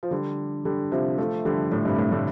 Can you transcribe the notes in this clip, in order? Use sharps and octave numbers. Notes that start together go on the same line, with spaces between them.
F3
D3 G3
D3 G3
C3 F3
F3 A3
D3 G3
A2 D3
G2 C3
A2
A2 D3